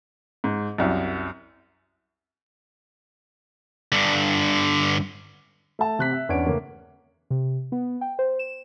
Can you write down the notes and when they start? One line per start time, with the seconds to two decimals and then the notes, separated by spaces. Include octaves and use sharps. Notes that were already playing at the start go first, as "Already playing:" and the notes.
0.44 G#2
0.78 C2 F#2
3.92 G2 D3
5.79 A3 A5
5.99 C3 F#6 B6
6.12 E5
6.29 E2 C#4 D4 C#5 D7
6.45 C#3 A3 A#3 C#4
7.30 C3
7.72 B3
8.01 G5
8.19 C5
8.39 E7